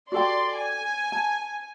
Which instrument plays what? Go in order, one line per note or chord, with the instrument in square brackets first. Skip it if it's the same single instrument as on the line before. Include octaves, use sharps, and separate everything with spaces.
[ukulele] F#4 A4 G5 [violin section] D5 C6
[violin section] G#5
[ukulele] A5